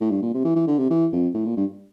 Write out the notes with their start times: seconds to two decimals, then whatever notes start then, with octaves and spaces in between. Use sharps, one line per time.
0.01 A2
0.11 G2
0.22 A#2
0.34 C3
0.45 E3
0.56 E3
0.67 D3
0.78 C3
0.90 E3
1.12 F2
1.34 A2
1.45 A#2
1.57 G2